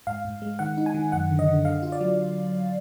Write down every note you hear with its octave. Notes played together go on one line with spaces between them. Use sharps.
G#2 F5
G#2
G#3
D#3 F#5
D#4
G#5
D#3
F#2 F#5
D3
D#5
D3
D3 F5
F4
D5
F#3